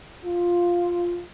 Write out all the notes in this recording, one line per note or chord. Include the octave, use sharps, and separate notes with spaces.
F4